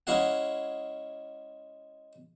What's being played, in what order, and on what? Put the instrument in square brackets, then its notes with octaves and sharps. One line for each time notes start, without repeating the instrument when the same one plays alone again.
[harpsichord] G#3 C#4 E4 G#4 F5 F#5